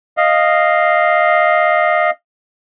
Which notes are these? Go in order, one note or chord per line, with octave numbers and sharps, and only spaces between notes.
D#5 F5